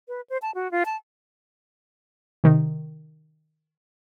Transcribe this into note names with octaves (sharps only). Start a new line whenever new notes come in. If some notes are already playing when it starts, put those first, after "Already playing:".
B4
C5
A5
F#4
F4
A5
C3 D#3